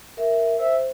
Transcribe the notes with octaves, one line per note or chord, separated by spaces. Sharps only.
A#4 E5
C5 E5